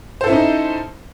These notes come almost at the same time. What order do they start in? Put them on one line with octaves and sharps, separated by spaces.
C5 A4 E4 C#4 D#4